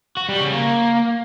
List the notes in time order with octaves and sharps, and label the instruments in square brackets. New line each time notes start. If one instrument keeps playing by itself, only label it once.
[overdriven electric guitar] F#4
G3
C#3
A#3